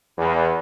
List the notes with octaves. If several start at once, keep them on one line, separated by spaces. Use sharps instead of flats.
E2